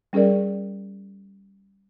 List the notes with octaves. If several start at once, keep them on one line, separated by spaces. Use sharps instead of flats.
G3 C#4 G#4 A#4 D5